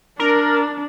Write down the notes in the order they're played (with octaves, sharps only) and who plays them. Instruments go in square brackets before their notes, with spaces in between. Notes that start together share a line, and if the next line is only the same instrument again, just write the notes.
[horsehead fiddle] D4 [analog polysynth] A#4